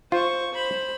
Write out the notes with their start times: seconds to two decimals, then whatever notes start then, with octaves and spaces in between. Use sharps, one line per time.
0.12 F4 C5 C#6
0.53 C5 B5